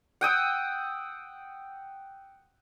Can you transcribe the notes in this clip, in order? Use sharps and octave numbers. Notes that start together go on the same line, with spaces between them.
F#5 G5 D#6 E6